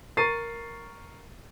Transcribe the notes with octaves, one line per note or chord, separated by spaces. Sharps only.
A#4 C#6 A6 C7 D#7